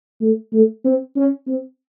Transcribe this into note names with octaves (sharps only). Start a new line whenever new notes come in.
A3
A3
C4
C#4
C4